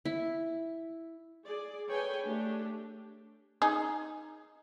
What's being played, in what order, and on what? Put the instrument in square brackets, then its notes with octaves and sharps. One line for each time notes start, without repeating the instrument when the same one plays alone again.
[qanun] E4
[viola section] G#4 D5
G#4 A4 B4 C#5 G5 G#5
A3 D4 G4
[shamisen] D#4 G#4